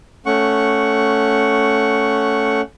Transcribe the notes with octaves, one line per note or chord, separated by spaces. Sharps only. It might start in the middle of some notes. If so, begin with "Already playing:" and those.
A3 C#4 F#5 C#6